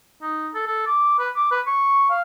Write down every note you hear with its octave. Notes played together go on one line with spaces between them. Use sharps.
D#4
A4
A4
D6
B4
D6
B4
C#6
F5